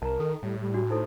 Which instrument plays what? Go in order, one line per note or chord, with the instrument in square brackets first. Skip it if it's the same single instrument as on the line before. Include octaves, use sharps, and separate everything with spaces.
[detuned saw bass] C2 [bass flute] A#4 [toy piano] A5 A#5
[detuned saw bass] D#3 [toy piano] A4
[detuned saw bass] A2 [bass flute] G3
[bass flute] G3
[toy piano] D4 F#4
[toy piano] D#4 E4 A4 [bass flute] C5